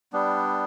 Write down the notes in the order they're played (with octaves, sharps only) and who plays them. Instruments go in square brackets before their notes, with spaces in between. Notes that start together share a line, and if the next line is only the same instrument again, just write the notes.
[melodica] G3 B3 D4